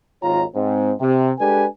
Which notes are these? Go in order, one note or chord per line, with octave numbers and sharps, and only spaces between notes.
G#1 D#2 F4 C#5 A#5
G#2 C4
C3
G#3 D4 G4 A4 B4 G#5